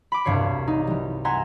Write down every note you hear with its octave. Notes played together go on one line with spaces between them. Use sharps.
B5 D6
E1 C2 G2 C#5 C7
D#4
E3 G3
E5 F#5 G#5 A#5 C6